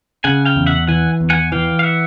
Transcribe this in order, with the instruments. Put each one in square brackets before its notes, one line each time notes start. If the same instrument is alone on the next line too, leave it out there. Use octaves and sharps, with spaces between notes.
[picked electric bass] C#3 [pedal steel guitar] F#5 G#5
[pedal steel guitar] F5 G5
[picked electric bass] E2
[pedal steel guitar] E5 F#5
[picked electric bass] E3 [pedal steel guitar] F#5 G#5
[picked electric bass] E2
[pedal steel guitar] F#5 G#5
[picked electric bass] E3 [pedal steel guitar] F5 G5
[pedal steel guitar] F5
E5 F#5